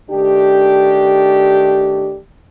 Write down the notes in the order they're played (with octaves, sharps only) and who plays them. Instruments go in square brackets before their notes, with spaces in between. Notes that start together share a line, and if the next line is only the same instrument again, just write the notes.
[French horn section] D#3 A3 D4 G4